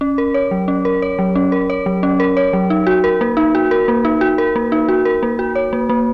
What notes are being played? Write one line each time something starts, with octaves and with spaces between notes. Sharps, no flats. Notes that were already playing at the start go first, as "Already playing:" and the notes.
C#4
A#4
C#5
F#3
C#4
A#4
C#5
F#3
C#4
A#4
C#5
F#3
C#4
A#4
C#5
F#3
D#4
F#4
A#4
A#3
D#4
F#4
A#4
A#3
D#4
F#4
A#4
A#3
D#4
F#4
A#4
A#3
F#4
C#5
A#3
A#3